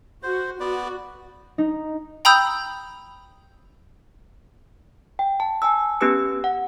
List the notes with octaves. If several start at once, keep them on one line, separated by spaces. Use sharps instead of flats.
F#4 C5
B3 F#4 D5
D#4
G5 A#5 B5 D#6 E6 G6
G5
A5
G#5 A5 E6
B3 C#4 G4 B4 E6 C#7
F#5